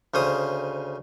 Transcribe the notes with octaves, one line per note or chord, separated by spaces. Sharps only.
D2 C#3 C5 D#6